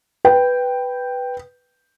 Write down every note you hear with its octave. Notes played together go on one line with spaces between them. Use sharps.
B4 G5